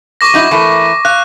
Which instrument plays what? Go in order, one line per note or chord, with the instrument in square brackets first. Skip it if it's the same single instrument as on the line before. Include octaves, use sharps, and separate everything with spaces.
[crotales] C#6 D6 A#6
[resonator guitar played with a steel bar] F#3 D#4 E4
E3 A3 A#4
[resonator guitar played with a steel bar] F5 [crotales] F#6